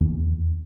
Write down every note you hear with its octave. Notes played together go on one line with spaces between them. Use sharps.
E2